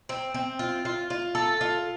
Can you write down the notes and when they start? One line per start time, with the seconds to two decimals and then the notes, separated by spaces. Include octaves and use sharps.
0.09 C4
0.34 C4
0.59 F4
0.85 F4
1.10 F4
1.35 A4
1.61 F4